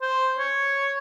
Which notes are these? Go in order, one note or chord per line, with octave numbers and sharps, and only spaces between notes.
C5
C#5